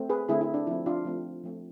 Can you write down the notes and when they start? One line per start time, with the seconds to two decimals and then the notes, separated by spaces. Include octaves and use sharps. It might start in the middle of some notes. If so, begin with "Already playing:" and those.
Already playing: A3 C4
0.10 G#4 B4
0.29 D3 A3 C4 E4 G#4
0.41 E4
0.54 D4
0.67 F3 A3 C4 E4
0.86 D4 F4
1.05 F3 A3 C4
1.44 F3 A3 C4